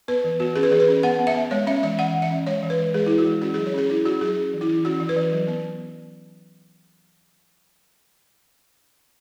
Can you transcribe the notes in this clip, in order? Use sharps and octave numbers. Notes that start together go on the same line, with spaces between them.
B3 B4
E3
B3 F#4
C#4 G#4
B4
E3 G#4
B4
C#4
B3 F#5
B3
E5
B3
G#3 C#5
C#4 E5
E3 E5
E3 F#5
E3
E5
C#4
G#3 C#5
E3
B4
E3
G#3 G#4
G#3 E4
F#4
E3
C#4 F#4
G#4
F#3
C#5
C#4 G#4
C#4 E4
C#4 F#4
F#3 G#4
C#4
E3
E4
E3
C#4 F#4
E3
B4
E3
F#3
B3